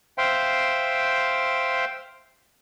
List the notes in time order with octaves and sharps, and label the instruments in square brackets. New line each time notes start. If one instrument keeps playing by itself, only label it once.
[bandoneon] C5 E5 F5 G5 C6